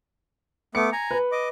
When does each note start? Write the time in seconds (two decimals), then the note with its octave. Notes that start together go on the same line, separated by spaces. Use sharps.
0.75 A3 B3 D6 C#7
0.92 G#5 A#5
1.11 B4
1.32 D#5 D6